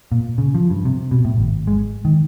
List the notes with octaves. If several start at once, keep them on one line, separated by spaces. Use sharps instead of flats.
A#2
C#3
F3
G2
C3
B2
A2
G#1
G#3
D#3